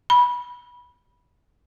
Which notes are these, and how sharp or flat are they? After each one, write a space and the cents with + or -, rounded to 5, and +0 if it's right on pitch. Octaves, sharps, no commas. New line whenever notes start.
B5 -20